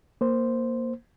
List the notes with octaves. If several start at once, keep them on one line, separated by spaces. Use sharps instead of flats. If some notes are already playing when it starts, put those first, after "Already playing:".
A#3 C5